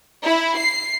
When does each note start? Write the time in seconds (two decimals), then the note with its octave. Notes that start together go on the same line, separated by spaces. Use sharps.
0.25 E4
0.58 C7